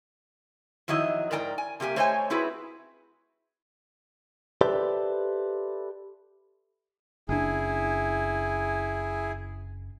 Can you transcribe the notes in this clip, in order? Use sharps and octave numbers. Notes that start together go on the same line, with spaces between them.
F2 D#3 F#3 E4 D#5
G#2 A#4 D5 G5 G#5 A#5
G#5
C3 A#3 G4 G#5
A3 C5 C#5 D#5 G5 G#5
C4 E4 F#4 G#4 B4
G4 A4 B4 C5 D5 E5
F#1 D4 E4 G#4